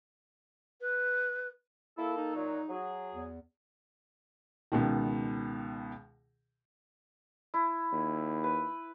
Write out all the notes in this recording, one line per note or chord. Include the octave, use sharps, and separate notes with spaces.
B4
A#3 E4 A4
D#4
A#2 F#3
F#3 G#4
E2
C#2 B2 D#3
E4
D#2
B4